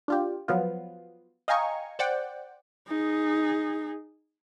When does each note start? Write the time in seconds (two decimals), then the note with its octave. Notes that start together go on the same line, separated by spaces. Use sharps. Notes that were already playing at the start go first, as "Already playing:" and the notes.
0.08 D4 F4 G4
0.48 F3 F#3 B3 F4
1.48 D#5 F5 G5 G#5 A#5 C#6
1.99 C5 D5 F#5 G5
2.88 D#4 G#4